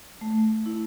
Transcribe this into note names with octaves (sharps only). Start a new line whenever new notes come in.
A3
E4